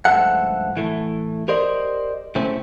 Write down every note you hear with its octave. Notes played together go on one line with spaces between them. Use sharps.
C#2 G2 F3 A3 A4 F#5
A2 E3 A3
G4 A#4 C5 D5 D#5
A2 C#3 A3 C4 C#4